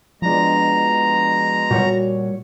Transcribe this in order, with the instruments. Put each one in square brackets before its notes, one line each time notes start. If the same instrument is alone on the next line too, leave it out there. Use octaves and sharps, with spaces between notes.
[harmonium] B2 G#3 [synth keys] F3 D4 [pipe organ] A#5
[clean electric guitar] A#2 G3 C#5 [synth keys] F#4